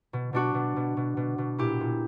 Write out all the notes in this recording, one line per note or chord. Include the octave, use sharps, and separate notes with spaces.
B2
B2 D4 F#4
B2
B2
B2
B2
B2
A#2 E4 G4
A#2